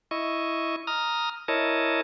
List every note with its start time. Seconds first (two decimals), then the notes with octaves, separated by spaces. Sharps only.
0.11 E4 D#5 C#6
0.87 A#5 D#6 F6
1.48 E4 A#4 C#5 D#5 A5